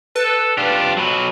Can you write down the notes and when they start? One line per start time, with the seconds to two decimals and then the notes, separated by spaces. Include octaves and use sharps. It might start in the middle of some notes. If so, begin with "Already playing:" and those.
0.16 A4 B4
0.57 D4 F4 G4
0.97 F2 F#3 B4